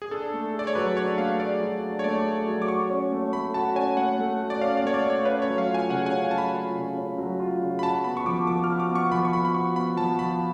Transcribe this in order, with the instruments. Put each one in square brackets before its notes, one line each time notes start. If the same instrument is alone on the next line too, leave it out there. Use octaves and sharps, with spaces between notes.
[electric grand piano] G#4
[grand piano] D4 [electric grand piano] A4
[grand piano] A3
G#4
[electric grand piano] D5
C#5
[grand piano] F#3 [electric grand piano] B4
[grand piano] D4 [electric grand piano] C#5
[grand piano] A3 [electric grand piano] F5
[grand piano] G#4 [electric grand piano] D5
[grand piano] F#3
D4
[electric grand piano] C#5
[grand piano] A3 [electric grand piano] D5
[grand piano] G#4
F#3
[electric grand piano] D6
[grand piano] F#4 [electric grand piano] C#6
[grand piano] C#4
A3
[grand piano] A3 [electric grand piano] B5
[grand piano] F#4 [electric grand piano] A5
[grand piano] C#4 [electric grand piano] G#5
[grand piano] A3 [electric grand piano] F#5
[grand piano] A3
F#4
[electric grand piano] D5
[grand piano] C#4 [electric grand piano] F5
[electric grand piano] D5
[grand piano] A3 [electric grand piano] C#5
[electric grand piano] D5
[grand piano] A3
[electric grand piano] C#5
[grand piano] C#4 [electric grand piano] B4
[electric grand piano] C#5
[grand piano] F#3
[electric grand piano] F5
[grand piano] F4
[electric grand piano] G#5
[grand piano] C#3 [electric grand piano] F#5
[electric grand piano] G#5
[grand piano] C#4
[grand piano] F#3 [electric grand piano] A5
[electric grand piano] B5
[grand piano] F4
C#3
C#4
F#3
F4
C#3
[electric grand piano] B5
[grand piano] F#4 [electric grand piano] A5
[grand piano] B3 [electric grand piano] B5
[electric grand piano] C#6
[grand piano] F3 [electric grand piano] D6
[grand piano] F3 [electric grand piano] D6
[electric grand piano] F6
[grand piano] F#4
[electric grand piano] D6
[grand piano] B3 [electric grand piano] C#6
[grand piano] F3 [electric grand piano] B5
[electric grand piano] C#6
[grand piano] F3 [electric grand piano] B5
[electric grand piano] B5
[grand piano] F#4 [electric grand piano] C#6
[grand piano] B3 [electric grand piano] B5
[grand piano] F3 [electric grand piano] A5
[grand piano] F3 [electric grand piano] B5